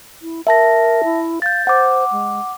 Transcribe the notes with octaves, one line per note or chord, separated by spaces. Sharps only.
E4
A#4 E5 A5 A#6
E4
F5 G6 A6
C5 F#5 D6
G#3